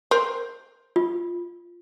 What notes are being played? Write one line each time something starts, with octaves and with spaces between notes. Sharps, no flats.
A#4 C5
F4